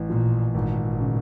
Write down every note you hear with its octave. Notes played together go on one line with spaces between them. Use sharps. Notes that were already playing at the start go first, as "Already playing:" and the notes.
Already playing: A1
A#2 F3
G#1 A#2
C#3